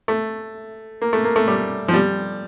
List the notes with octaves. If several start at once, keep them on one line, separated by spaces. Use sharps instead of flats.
A3
A#3
A3
A#3
A3
G3
F3
G3